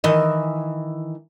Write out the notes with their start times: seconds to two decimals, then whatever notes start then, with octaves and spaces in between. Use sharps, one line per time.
0.04 D#3 E3 D#5